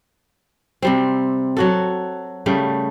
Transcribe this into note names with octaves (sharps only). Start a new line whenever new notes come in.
C3 G3 C4
F#3 F#4 A4
C#3 G3 A3